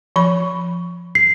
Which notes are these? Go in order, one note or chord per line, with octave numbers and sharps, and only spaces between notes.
F3 B5
C7